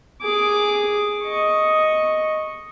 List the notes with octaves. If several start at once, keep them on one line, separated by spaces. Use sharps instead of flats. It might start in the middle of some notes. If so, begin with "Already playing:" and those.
G#4 D6
D#5 C#6